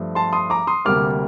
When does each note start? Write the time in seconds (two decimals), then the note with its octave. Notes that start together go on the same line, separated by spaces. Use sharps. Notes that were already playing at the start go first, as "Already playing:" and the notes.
Already playing: G2 F3 A3
0.15 A5 C6
0.33 C6 D#6
0.50 A#5 D6
0.67 C6 D#6
0.85 D2 C3 G3 A#3 D6 F6